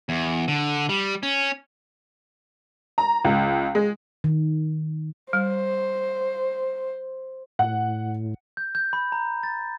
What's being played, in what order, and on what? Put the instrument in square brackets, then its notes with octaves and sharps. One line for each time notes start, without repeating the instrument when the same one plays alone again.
[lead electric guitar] E2
D3
G3
C#4
[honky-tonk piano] A#5
C#2
G#3
[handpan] D#3
[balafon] G3 [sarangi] C5
[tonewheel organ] A2 [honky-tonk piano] F#5
[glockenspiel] G6
G6
B5
A#5
A6